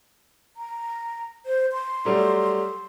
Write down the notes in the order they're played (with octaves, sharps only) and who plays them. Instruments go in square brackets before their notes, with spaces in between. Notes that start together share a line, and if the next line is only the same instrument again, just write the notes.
[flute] A#5
C5
C6
[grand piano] F#3 G3 A3